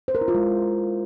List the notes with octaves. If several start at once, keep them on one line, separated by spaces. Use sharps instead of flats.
C5
A#4
E4
F4
G#3